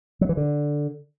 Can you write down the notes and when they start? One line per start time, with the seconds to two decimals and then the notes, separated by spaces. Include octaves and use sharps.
0.21 F#3
0.29 E3
0.37 D3